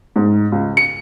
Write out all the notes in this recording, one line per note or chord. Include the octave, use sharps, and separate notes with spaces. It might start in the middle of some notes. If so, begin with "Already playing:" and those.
G#2
C#2
C#7